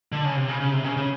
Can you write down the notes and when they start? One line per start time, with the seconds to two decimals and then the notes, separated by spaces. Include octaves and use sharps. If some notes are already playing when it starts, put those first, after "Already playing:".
0.12 D3
0.25 C#3
0.36 C3
0.48 C#3
0.60 C#3
0.72 C3
0.84 C#3
0.97 C#3